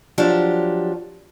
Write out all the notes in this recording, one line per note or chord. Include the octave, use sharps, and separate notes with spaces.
F3 F#3 D4 G4